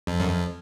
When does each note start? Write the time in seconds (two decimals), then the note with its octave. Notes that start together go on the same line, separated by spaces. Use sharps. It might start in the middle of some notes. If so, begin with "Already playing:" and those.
0.07 F2
0.20 F#2
0.29 F2